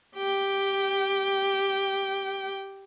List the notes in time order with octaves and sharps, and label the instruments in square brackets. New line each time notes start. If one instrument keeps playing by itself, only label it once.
[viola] G4 G5